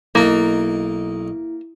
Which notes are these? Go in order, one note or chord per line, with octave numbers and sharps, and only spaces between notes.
B1 A#3 D#4 E4